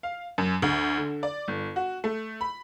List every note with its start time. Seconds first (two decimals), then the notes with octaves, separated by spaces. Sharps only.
0.03 F5
0.38 F#2
0.62 D2
0.98 D3
1.23 D5
1.48 G1
1.76 F#4
2.04 A3
2.41 B5